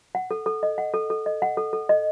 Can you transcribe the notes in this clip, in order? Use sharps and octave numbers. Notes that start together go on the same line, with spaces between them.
F#5
A4
A4
D#5
F#5
A4
A4
D#5
F#5
A4
A4
D#5